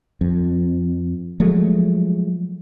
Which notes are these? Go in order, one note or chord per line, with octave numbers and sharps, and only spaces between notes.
F2
F3 F#3 G#3 A3